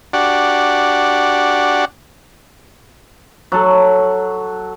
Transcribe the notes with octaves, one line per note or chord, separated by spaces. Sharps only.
D4 F#4 G4 D5 F#5
F#3 A4